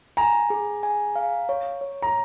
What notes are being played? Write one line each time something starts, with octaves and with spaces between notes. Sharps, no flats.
G#5 A#5
G#4
G#5
F5
C#5
C#5
A#5